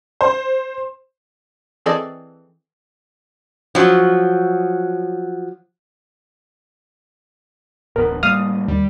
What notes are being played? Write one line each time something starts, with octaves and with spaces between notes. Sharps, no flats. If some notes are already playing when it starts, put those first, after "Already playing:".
C5
E3 C4 G#4 A4 D5 D#5
F3 F#3
D1 A1 B3 A#4
A2 G3 A#3 F5 D#6
D#2 G3